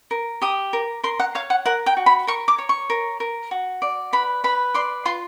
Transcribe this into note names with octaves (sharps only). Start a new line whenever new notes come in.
A#4
G4 D#6
A#4
A#4 C6
F#5
C#5 F5
F#5
A#4 F#5
G5
F#4
B5
A#4 C#6
D6
C#5
C#6
A#4
A#4
F#4
D5
B4 B5
B4 B5
D5 C6
F4 C6